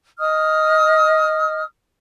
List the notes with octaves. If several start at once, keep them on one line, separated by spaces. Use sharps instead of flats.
D#5 D#6 F6